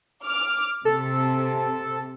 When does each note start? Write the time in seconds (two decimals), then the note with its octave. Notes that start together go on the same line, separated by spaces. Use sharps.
0.24 D6 F6
0.85 C3 A4